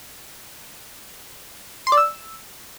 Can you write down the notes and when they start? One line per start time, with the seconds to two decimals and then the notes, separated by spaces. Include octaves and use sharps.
1.87 C6
1.92 D5
1.97 E6